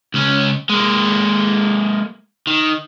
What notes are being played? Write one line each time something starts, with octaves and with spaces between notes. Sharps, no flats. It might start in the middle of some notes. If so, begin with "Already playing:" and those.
C#2 C#4
G#3 A#3
D#3